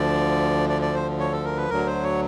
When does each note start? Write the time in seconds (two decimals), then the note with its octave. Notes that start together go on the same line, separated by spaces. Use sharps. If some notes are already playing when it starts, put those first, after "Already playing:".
Already playing: D2 D3 F3 D5
0.69 D5
0.82 D5
0.94 C5
1.20 C#5
1.32 A4
1.45 A#4
1.57 B4
1.70 D2 D3 F#3 A#4
1.86 C5
2.03 C#5